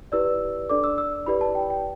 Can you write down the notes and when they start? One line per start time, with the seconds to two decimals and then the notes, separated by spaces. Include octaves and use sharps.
0.12 E4 G4 B4 D5 E6
0.69 D4 A4 D5 D6
0.84 E6
0.98 E6
1.26 E4 G4 B4 D5 B5
1.41 A5
1.55 G5
1.70 G5